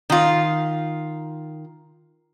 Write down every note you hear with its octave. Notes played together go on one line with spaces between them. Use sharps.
D#3 F4